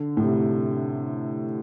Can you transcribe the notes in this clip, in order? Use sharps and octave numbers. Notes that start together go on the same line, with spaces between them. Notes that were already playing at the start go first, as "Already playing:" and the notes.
Already playing: D3
A2
C3